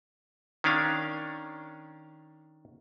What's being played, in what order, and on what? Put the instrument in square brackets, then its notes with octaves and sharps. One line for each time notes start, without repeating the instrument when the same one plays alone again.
[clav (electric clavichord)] D#3 C#4 D4 F5